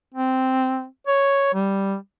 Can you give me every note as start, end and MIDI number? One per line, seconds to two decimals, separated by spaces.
0.14 0.85 60
1.07 1.53 73
1.54 1.96 55